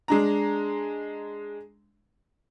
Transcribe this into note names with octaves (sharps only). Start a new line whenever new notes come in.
G#3 D4 A#5